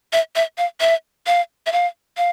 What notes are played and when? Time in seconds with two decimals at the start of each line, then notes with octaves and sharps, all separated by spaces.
0.13 E5
0.36 E5
0.58 F5
0.80 E5
1.27 F5
1.66 E5
1.72 F5
2.17 F5